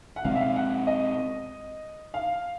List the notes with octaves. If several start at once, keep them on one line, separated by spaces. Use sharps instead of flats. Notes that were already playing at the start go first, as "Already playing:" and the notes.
F#5
B2 G#3 C4 F5
E5
F5
F#5
D#5
F5